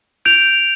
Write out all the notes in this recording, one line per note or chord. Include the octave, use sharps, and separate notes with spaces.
G6 D7 F7